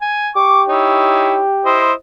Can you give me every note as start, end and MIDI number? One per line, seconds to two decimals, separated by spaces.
0.01 0.29 80
0.36 1.92 67
0.36 0.62 85
0.36 0.62 86
0.68 1.44 63
0.68 1.44 64
0.68 1.44 73
1.65 1.93 64
1.65 1.93 72
1.65 1.93 75